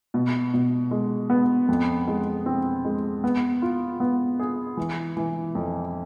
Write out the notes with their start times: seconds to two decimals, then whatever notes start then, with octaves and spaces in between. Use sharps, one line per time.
0.14 B2
0.54 B2
0.91 G#3
1.30 B3
1.68 F2
2.08 G#3
2.46 C4
2.85 G#3
3.24 B3
3.62 F4
4.00 B3
4.39 G#4
4.77 E3
5.17 E3
5.55 F2